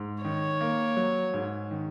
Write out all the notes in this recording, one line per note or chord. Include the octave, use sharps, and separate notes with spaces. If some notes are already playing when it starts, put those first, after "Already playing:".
Already playing: G#2
D#3 C#5
A#3
F#3
G#2
D#3